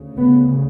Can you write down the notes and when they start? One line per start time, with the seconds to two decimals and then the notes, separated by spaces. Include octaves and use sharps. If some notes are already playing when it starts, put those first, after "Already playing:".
Already playing: D2 C#3
0.16 B3